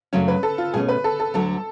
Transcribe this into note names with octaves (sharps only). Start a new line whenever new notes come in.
F#2 C#3 F#3 A3 C#4
B4
A4
F4
B2 A3 C#4 G#4
B4
A4
A4
D2 D3 F#3 A4